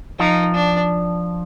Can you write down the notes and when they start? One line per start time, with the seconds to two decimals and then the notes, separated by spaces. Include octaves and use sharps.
0.19 F3 D#4
0.54 D4